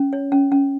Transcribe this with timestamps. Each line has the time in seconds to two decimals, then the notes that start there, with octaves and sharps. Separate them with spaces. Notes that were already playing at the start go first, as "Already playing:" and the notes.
Already playing: C#4
0.13 C#5
0.32 C#4
0.52 C#4